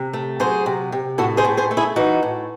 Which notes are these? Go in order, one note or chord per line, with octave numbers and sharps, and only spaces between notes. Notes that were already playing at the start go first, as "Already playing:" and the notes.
Already playing: C3
A3
F#3 G#4 C5
C3
C3
A2 F#4 A4
G#4 C5
A2
G#4 C5
A3
E4 G#4
E3 D#4 F#4
A2